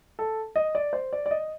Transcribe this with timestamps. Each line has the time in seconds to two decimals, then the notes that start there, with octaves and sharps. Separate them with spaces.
0.19 A4
0.56 D#5
0.75 D5
0.93 C5
1.13 D5
1.26 D5
1.31 D#5